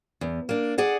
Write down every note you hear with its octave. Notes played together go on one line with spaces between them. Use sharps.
E2
A#3 D4
G#4 D5 F#5